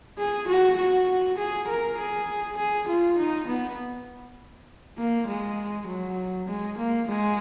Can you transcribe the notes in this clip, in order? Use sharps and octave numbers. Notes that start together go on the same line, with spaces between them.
G#4
F#4
F#4
G#4
A#4
G#4
G#4
F4
D#4
B3
A#3
G#3
F#3
G#3
A#3
G#3